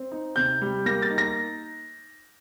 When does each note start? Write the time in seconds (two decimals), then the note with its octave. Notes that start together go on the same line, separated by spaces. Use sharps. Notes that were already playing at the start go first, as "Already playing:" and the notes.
Already playing: C4
0.12 D#4
0.36 C3 G6
0.62 G3
0.86 A#3 A#6
1.02 A6
1.10 D#4
1.18 A#6